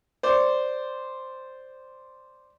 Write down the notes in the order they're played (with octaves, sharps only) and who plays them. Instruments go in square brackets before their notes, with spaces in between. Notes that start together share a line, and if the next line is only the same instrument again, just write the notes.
[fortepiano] C5 D5